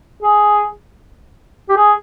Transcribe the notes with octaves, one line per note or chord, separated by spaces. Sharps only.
G#4
G4
G#4